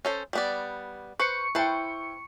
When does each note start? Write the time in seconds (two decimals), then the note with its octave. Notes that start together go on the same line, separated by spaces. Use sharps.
0.05 C#4 A4 C5
0.33 G3 B3 D5
1.20 B4 C5 C#6 C#7
1.55 E4 B4 C5 G5 A5